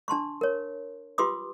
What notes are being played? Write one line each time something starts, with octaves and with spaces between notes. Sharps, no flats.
D4 A5 C6 C#6
A#4 C#5
F4 G4 B4 C6 D6 D#6